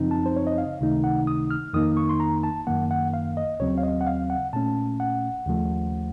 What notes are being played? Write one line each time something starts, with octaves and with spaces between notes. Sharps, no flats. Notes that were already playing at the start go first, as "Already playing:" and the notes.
Already playing: F#2 C#3 F3 C4 D#4
A5
C5
C#5
D#5
F5
C#2 C3 D#3 A3 D#4
F#5
D#6
F6
F2 D#3 A#3 D#4 D#6
C#6
C6
A#5
A5
F#2 D#3 A#3 F#5
F#5
F5
D#5
D#2 C#3 F#3 C4 C#5
F5
D#5
F#5
F5
F#5
A#2 A3 C#4 A5
F#5
D#2 C#3 F3 A3